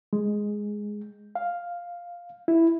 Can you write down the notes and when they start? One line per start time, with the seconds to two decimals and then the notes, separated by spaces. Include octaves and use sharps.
0.13 G#3
1.35 F5
2.48 E4